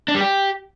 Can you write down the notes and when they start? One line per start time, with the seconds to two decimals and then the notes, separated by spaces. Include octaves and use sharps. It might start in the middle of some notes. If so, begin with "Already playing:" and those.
0.08 D4
0.15 G3
0.21 G4